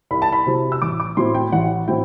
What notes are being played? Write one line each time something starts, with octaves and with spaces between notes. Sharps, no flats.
C2 B5
A5
B5
C3 F#3 C4 E4
E6
A1 D6
D6
A2 F#3 C4 E4 C6
G5
A1 F#5
A2 F#3 C4 E4 G5